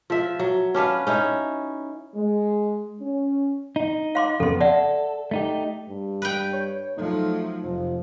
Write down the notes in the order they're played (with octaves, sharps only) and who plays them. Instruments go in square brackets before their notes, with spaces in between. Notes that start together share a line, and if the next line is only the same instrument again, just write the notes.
[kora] F3 E5
F#3
C#4 D4 B4 F5
C#4 D#4 E4
[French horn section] G#3
C#4
[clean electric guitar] D#4
[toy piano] F5 C6 D6
[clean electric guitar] F2 C#3 B3 [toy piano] A4 C6
[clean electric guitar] A4 [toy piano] D5 E5 F#5
[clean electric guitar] A3 D#4 G4
[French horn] G2
[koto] B4 G5
[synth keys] C#5
[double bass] F3 F#3 [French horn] A3 [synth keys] D#4
[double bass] F1 [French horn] F3